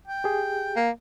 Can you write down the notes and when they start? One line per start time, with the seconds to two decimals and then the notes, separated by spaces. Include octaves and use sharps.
0.07 G5
0.24 G4 G#4
0.76 A#3